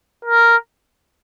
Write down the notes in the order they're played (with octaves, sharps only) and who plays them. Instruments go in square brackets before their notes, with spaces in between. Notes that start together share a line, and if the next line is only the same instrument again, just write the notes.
[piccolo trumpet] A#4